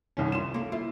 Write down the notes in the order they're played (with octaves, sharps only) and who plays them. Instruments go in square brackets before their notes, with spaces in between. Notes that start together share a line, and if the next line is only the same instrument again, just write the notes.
[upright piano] C2 D#3 C#4
[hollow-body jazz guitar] C2 F4 C6 [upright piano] E7
[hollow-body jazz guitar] A#3 A4
[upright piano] E4 [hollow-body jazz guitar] F4